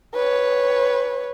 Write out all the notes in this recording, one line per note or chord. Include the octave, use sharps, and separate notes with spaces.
B4 C#5